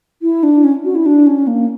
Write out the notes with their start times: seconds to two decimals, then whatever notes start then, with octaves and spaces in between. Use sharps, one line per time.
0.22 E4
0.43 D4
0.64 C#4
0.85 F#4
0.95 E4
1.06 D4
1.27 C#4
1.47 A#3